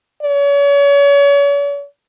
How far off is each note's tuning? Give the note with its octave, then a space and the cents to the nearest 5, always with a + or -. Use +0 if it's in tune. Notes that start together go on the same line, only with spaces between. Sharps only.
C#5 +40